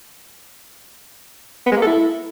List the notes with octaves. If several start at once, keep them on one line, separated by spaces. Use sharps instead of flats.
B3
G#3
A#3
A4
E4